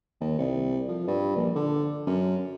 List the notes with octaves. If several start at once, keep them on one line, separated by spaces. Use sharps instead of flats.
D#2
C2
F3
G2
A#1
D3
F#2